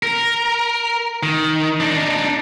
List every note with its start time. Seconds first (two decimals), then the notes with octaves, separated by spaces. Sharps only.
0.03 A#4
1.23 D#3
1.80 D4 D#4